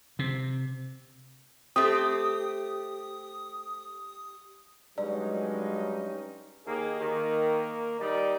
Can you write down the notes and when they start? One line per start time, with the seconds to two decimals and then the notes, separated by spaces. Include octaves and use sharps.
0.19 C3
1.76 A3 C4 G4 D#6
4.98 G2 F#3 G#3 C#4 D#4 D5
6.66 D#2 D#3 A#3 G#4
7.00 D#3 A#3
8.00 D#3 G3 D#4 D5